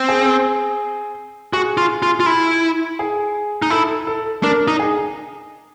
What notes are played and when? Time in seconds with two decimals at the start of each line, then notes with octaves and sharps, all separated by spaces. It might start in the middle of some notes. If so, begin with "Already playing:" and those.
Already playing: C4
0.09 G#4
1.53 F#4 G#4
1.77 F4
2.03 F4
2.20 F4
2.26 E4
2.99 G#4
3.62 D#4
3.70 E4 A4
4.07 A4
4.43 D4 A#4
4.68 D#4
4.79 G#4